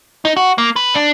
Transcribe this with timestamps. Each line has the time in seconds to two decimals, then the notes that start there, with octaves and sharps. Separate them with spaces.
0.25 D#4
0.37 F#4
0.58 A#3
0.76 B4
0.94 D4